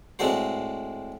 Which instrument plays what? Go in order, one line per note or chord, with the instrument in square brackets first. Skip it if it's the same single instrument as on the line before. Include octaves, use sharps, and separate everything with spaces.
[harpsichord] A2 G#3 C4 D4 F#4 C5